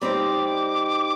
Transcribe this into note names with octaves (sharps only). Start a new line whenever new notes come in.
G3 C4 D#4 G4 D6